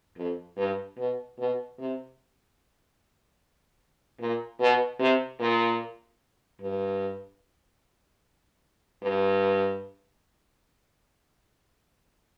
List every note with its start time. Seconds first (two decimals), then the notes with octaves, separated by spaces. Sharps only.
0.17 F2
0.57 G2
0.97 B2
1.39 B2
1.79 C3
4.20 A#2
4.60 B2
4.99 C3
5.40 A#2
6.61 G2
9.03 G2